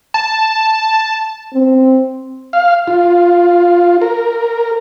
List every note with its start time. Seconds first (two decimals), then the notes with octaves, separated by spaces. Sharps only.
0.14 A5
1.53 C4
2.53 F5
2.87 F4
4.02 A#4